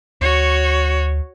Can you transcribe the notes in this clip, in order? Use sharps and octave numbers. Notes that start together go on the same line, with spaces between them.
D2 F#4 C#5